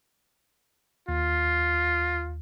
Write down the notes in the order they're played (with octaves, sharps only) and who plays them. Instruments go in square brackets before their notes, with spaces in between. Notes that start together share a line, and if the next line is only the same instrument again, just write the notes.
[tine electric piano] D#2 [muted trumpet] F4